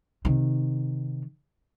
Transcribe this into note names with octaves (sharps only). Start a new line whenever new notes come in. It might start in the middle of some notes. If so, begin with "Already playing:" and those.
C3 D#3